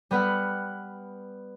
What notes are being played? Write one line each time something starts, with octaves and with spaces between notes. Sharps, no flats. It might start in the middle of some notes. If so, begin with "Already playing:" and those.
G3 B3 B4 F#5 F6